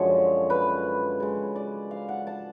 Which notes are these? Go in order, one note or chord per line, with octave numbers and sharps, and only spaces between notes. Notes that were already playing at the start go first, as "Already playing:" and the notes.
Already playing: F#2 D3 F3 G#3 C#5
B4
C#3 G#3
D5
F5
F#5
A5